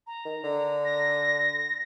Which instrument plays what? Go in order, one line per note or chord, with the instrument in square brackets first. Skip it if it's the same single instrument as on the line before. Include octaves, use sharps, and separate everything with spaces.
[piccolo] A#5
[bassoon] D#3
D3
[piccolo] A#6